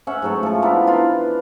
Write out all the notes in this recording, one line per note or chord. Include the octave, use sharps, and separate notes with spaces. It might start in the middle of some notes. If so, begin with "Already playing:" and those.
C#4 E5 F#5
G#2 F#3 A3
F3 A4
B3 D4 E4 A#4
F4 B4 C6